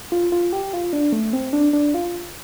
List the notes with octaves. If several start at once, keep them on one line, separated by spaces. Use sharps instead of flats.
F4
F4
G4
F4
D4
A3
C4
D4
D4
F4